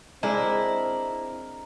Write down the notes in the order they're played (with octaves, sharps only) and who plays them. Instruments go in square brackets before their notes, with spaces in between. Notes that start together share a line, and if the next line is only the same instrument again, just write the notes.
[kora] G#3 D4 [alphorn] C4 [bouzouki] E4 [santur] A#4